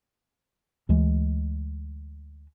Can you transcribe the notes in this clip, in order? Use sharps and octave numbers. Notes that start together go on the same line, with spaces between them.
D2 E3 G#3